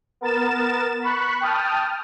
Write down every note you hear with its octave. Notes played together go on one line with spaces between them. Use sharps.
B3 A#4 A6 E7
B5 C#6 F#6
G5 A5 D#6 F6